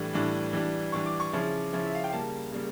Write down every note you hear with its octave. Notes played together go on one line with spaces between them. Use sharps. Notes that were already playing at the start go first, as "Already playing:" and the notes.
Already playing: A2 E3 G3 D4
A2 E3 G3 D4
E3 G3 D4
E3 G3 D4 C#6
D6
C#6
C#3 F3 C#4 E4
C#3 F3 C#4 E4
E5
F5
G5
C#3 G3 A#3 A5
C#3 G3 A#3